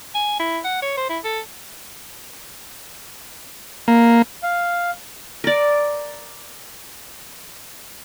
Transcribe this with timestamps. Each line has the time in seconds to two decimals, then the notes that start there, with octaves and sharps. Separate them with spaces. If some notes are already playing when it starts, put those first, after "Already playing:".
0.15 G#5
0.40 E4
0.64 F#5
0.82 C#5
0.97 C5
1.10 E4
1.24 A4
3.88 A#3
4.43 F5
5.44 A#4 D5